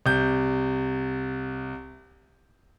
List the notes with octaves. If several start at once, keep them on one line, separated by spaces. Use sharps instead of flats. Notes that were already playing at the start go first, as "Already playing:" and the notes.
C2 G6